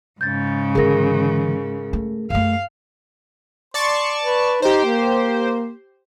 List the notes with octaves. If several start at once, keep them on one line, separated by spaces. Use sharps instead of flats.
G#2 C#3 G6 A6
D3 E3 G#4 A#4 A#6
A3
F#2 A3 F5
D5 A5 C6 C#6
B4
D#4 G4 C5
A#3